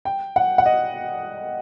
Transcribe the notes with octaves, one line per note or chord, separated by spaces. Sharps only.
G5
F#5
F#5
D#5